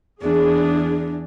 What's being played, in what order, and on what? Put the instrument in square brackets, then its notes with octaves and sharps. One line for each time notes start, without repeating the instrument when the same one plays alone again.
[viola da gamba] E2 [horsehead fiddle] D4 [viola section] G#4